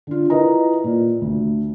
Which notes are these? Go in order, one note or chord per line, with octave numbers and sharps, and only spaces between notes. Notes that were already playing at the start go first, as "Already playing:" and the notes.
D3 F4
E4 F4 A#4 B4 D#5 A#5
A#2
D2